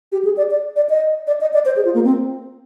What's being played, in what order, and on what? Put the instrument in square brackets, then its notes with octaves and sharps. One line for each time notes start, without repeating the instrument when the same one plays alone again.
[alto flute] G4
G#4
D5
D5
D5
D#5
D5
D#5
D5
C5
G#4
F4
A#3
C4